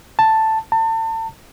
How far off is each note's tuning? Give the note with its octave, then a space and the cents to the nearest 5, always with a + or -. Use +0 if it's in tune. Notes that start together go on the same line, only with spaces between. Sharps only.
A5 +5
A5 +35